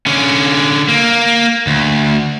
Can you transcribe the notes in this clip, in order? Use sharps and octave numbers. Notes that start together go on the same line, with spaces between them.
D3 C#4
A#3
D2